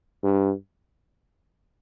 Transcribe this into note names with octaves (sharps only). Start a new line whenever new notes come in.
G2